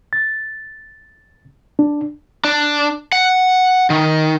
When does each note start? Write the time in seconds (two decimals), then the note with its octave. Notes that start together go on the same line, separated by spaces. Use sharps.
0.13 A6
1.79 D4
2.45 D4
3.12 F#5
3.90 D#3